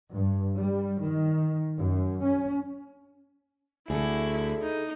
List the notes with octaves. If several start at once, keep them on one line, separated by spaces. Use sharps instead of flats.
G2
G3
D#3
F#2
C#4
D2 E4 G#4 A4
D#4